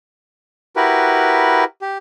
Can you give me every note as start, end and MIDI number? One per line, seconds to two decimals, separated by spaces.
0.76 1.64 64
0.76 1.64 66
0.76 1.64 67
0.76 1.64 70
0.76 1.64 71
1.82 1.98 67